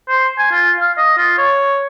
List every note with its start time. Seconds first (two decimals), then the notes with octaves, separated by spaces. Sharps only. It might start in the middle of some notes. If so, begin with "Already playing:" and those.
0.08 C5
0.39 G#5
0.51 F4
0.80 F5
0.98 D#5
1.17 F4
1.38 C#5